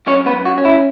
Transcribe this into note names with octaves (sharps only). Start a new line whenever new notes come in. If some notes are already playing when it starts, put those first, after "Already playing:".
F#2 C#4 C#5
B3 B4
F#2
F#4
C#4
E4